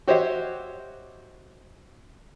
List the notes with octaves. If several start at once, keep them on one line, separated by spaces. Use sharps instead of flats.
F#4 G4 C5 C#5 D#5 E5